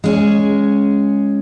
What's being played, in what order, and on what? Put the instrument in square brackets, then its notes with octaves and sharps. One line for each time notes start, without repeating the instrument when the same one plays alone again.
[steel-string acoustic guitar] G#3 C#4 G#4